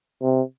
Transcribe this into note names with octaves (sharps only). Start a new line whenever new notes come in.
C3